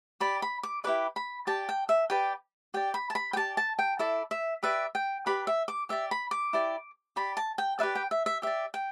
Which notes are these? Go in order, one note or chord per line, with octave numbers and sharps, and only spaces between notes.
G4 D5 B5
B5
D6
E4 G4 B4 D5 D6
B5
G4 D5 A5
G5
E5
G4 B4 D5 G5
G4 D5 G5
B5
A5
B5
G5
G4 D5 A5
A5
G5
E4 A4 D5 E5
E5
G4 B4 D5 E5
G5
G4 B4 D5 B5
E5
D6
G4 D5 E5
B5
D6
E4 G4 D5
G4 D5 B5
A5
G5
G4 B4 D5 E5
G5
E5
E5
G4 D5 E5
G5